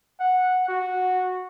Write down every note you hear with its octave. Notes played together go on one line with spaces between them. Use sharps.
F#5
F#4